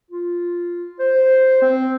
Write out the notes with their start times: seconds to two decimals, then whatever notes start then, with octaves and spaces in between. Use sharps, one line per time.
0.11 F4
0.99 C5
1.62 C4